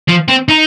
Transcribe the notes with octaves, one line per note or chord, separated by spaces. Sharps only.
F3
C4
D#4